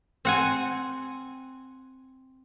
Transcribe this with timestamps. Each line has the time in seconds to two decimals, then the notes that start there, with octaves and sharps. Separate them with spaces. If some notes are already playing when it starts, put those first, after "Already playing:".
0.25 C4 F#5 G#5